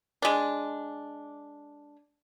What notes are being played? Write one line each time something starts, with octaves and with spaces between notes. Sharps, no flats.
G#3 D4